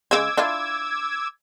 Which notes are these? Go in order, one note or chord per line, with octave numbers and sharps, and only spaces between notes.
C#3 G#3 D6 E6 G#6
D4 E4 F4